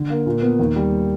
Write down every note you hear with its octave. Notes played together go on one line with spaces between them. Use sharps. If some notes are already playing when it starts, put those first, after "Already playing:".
Already playing: D3
A#3
A#2
B3
D#2
G3